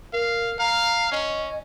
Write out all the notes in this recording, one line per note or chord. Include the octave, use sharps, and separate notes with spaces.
A#4 F5
F5 A#5
C#4 D#5